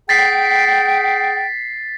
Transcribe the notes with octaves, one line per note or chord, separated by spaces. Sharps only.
G#4 F#5 G5 A6 B6 C7